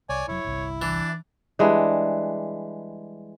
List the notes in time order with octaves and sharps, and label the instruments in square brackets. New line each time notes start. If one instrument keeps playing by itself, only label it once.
[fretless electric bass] C2 [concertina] C#5 D5 G#5
[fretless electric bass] F1 F#3 [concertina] E4 [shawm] C#5
[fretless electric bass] G1 C2
[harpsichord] E3 [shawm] D4
[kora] E3 G3 G#3 D4